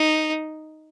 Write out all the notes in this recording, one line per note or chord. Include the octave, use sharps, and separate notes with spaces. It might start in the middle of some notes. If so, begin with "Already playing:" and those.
Already playing: D#4